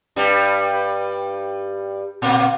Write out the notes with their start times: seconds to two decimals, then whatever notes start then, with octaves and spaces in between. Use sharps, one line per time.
0.16 G2 G3
2.22 A#2 A#3